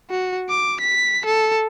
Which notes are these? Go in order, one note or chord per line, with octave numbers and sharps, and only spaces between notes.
F#4
D6
B6
A4